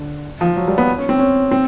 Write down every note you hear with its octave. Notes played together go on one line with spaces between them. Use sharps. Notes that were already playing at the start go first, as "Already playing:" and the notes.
Already playing: D3
F3
F#3
G3
B3
C#4
C4
C#4
C4